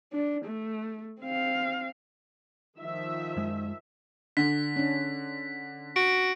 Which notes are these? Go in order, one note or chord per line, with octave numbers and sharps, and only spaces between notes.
D4
A3
C4 F5
D#3 F3 E5
F#2 G#3
D3 B6
C#4 D4
F#4 D7